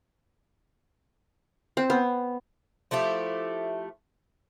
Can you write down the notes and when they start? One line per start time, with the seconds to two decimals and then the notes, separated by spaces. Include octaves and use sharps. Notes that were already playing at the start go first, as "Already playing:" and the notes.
1.77 C4
1.90 B3
2.91 F3 A3 E4 G4